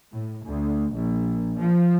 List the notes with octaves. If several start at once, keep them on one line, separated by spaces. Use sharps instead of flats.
A2
D2
A#1
F3